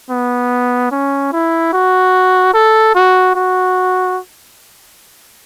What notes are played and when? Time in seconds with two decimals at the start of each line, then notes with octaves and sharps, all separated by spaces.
0.10 B3
0.92 C#4
1.32 E4
1.73 F#4
2.54 A4
2.95 F#4
3.36 F#4